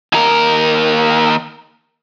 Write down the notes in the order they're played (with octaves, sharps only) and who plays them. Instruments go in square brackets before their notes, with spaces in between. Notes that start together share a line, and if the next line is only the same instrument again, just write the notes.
[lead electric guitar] D#2 A#4